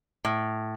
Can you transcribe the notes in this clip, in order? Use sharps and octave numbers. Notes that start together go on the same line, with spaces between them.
A2